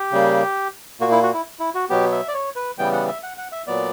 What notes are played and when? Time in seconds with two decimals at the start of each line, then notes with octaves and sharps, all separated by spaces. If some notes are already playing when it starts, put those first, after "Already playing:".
Already playing: G4
0.12 C#3 G3 A#3
1.00 A#2 A#3 F#4
1.12 E4
1.22 F#4
1.34 E4
1.59 E4
1.75 F#4
1.90 B2 F#3 B3 G4
2.12 E5
2.28 D5
2.34 C#5
2.56 B4
2.78 C#3 E3 G3 B3 G5
2.93 F#5
3.08 E5
3.23 F#5
3.38 F#5
3.52 E5
3.67 A#2 F#3 B3 D5